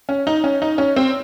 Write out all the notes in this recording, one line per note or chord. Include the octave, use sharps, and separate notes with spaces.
C#4
D#4
C#4
D#4
C#4
C4